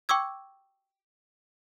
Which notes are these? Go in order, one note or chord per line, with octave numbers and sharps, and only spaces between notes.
G5 C#6 D6 E6 G#6